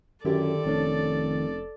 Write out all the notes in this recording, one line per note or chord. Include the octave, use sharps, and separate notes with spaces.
F#2 D3 D#3 E4 G4 A4 D5
F1 C#4 D4